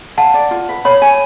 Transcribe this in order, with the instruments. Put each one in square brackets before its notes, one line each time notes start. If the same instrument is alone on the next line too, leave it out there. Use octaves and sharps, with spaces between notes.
[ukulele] F5 [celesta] F#5 A5
[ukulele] D5
F4
B4
[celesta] C#5 [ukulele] B5
[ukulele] G#5